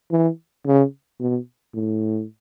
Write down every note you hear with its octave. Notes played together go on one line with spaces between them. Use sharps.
E3
C#3
B2
A2